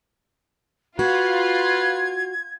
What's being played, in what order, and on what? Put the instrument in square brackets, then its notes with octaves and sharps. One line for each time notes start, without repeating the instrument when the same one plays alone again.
[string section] F4 [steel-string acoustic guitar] F#4 [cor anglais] B4 [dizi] G#6